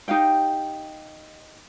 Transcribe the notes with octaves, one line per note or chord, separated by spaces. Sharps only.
D#4 G4 F5 G5